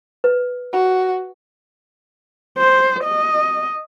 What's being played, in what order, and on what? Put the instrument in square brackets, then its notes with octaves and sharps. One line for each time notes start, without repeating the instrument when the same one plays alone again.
[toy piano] B4
[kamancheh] F#4
[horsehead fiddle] C5
D#5